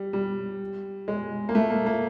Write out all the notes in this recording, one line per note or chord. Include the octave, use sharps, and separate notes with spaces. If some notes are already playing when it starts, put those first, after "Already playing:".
Already playing: G3
G3
G#3
A#3
A3
A#3
A#3